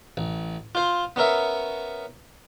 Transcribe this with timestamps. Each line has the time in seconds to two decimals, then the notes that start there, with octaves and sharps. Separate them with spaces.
0.17 A1
0.75 F4 C5
1.16 B3 C#4 A#4 E5